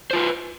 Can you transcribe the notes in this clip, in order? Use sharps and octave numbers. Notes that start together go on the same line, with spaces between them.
F4 B4 C5